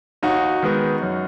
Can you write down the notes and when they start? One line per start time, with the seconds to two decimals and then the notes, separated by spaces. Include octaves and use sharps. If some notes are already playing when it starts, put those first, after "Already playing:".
0.23 D#2 D#4 F#4
0.62 D#3 G#3 B3
1.02 F#2